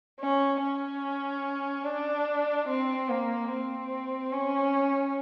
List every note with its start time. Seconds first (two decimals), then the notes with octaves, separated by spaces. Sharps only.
0.20 C#4
0.61 C#4
1.85 D4
2.68 C4
3.09 A#3
3.50 C4
4.33 C#4